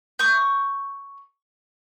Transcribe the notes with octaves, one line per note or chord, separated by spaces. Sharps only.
C#6 D#6 G6